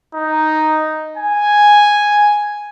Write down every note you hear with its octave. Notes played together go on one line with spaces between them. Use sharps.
D#4
G#5